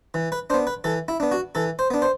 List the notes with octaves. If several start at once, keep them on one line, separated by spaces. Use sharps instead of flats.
E3
B4
B3 D4 C5
B4
E3 A4
E4
B3 D4
F#4
E3 A4
C5
B3 D4
C5